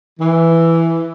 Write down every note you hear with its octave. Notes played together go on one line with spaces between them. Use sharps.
E3